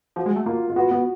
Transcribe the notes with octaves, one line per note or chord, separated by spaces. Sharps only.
F3 F#4
G#3
A3
A#3 F4
F4
B3 F#4
B3 F#4